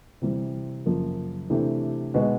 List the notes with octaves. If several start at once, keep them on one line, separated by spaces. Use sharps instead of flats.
C3 E3 G3
F#2 C#3 F3 A#3
C3 E3 A3 D4 G4
B2 G#3 B3 D#4 F#4